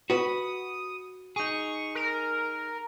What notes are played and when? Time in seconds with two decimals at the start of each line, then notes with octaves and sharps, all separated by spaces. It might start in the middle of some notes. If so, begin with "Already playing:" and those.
0.10 F#4 B4 D#6
1.36 D#4 G#4 C#6
1.95 A#4